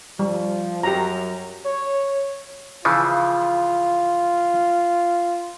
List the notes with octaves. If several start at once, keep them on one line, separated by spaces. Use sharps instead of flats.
F3 G3
F#2 G4 A#5
C#5
C#3 E3 F3 F4